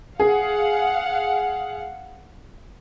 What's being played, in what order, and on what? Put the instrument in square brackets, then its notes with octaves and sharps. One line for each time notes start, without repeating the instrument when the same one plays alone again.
[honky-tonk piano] G#4 [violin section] F5 F#5